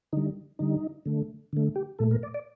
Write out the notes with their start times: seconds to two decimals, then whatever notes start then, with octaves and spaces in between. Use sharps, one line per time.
0.13 D3 G3 D#4
0.59 D3 G3 D#4
1.05 D3 A3
1.53 D3 A3
1.76 G4
1.99 A#2 A3 A4
2.11 A#4
2.23 D5
2.34 D5